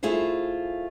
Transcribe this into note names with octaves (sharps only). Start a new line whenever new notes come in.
A3 E4 F4 G#4 C5